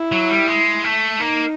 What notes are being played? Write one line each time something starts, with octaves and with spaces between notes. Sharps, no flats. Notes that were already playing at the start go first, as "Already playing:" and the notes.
Already playing: E4
F#3
G3
G#3
A3
A#3 D#4